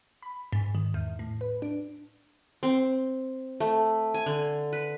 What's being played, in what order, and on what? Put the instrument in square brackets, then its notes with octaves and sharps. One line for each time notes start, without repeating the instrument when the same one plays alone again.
[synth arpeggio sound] B5
G#2
D#3
E2
A2
B4
D4
[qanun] C4
A3
G#5
D3
B4